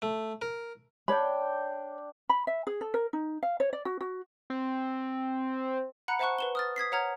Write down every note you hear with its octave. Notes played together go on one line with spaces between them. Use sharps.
A3
A#4
D4 C#5 G5 B5
B5
E5
G#4
A4
A#4
D#4
F5
C#5
D5
F#4
F#4
C4
F#5 A#5 B5 F#6 C#7
C5 E5 F#5 A5 C#6 F#6
B4 E7 G7
D#6 F6 A6
D#6 G#6 B6 C7
C#5 F#5 A#5 F6 G#6